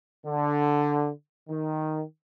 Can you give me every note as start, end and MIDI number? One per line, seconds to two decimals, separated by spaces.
0.24 1.09 50
1.49 2.02 51